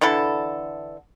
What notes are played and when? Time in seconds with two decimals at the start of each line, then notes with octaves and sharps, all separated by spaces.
0.01 D3 E3 E4 A4